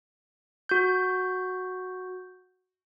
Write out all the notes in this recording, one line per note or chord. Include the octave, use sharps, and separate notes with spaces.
F#4 G6